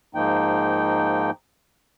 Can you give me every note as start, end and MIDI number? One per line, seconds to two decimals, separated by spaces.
0.15 1.31 44
0.15 1.31 53
0.15 1.31 58
0.15 1.31 63
0.15 1.31 79